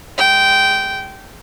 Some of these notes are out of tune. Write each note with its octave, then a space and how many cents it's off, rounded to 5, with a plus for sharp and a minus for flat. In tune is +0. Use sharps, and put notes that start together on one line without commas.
G#3 +0 G5 -15